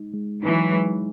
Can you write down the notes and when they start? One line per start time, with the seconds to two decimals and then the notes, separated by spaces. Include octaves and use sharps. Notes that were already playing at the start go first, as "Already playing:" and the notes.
Already playing: G#3 D#4
0.14 G#3
0.43 E3 F#3 D#4
0.73 G#3